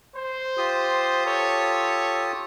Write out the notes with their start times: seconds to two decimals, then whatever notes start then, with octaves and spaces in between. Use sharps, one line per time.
0.14 C5
0.58 F4 G4 D#6
1.24 A4 C#5